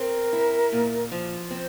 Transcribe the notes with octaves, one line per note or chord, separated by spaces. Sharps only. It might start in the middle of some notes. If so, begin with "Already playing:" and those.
Already playing: C4 A#4
E4
A#2
F3
C4 C5